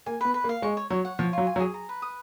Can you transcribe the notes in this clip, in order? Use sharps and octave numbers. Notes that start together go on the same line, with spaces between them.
A#3 G#5
B3 B4
B4
A#3
F5
G#3 C#6
C#5
F#3 C#5
F#5
F3 C#5
F#3 F4
G#5
F#3
G#4
A#5
B4
D#6